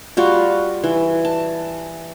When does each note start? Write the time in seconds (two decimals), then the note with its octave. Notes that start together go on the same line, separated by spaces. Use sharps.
0.17 G3 F4 F#4
0.84 E3
1.25 A5